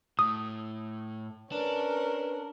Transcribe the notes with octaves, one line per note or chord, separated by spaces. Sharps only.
A2 D#6
C#4 D4 A#4 B4